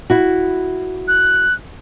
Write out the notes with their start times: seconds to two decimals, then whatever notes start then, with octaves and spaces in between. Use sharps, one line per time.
0.10 E4 F#4
1.08 F#6